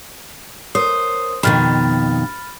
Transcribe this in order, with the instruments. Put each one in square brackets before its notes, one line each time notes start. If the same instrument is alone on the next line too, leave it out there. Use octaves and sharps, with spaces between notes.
[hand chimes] A#4 C#5 D#6 [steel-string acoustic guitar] C5
[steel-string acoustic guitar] F2 B2 D#3 [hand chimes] B5 F6 A6